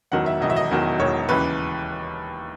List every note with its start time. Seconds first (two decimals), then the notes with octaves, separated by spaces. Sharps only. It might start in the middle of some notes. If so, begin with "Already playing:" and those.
0.11 E1 E2 D#3 F#3 F#5
0.26 E5
0.41 E1 E2 D#3 F#3 D#5
0.50 E5
0.56 D#5
0.71 E1 E2 D#3 F#3
0.99 E1 E2 D#3 F#3 C#5
1.29 D#2 C#3 E3 B4